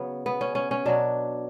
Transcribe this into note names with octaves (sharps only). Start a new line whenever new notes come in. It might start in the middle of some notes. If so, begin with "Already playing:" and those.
Already playing: C#3 F#3 B3
B3
C#4
C#4
C#4
B2 F#3 D4